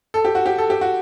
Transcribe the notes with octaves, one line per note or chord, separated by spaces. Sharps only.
A4
G4
F#4
G4
A4
G4
F#4